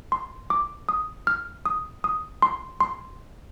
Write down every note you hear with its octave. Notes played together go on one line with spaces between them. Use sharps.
C6
D6
D#6
F6
D#6
D#6
C6
C6